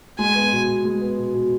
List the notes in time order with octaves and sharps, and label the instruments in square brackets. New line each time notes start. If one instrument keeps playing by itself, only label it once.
[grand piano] G#3 [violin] G#5
[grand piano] B3
B2
B2
G#3
B3
B2
B2